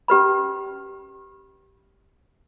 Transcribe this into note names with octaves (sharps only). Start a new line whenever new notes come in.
C#4 G4 B4 B5